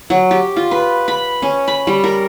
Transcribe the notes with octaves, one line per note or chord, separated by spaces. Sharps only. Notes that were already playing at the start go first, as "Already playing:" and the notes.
F#3
G4
F4
B4
B5
C#4
B5
G3
A#4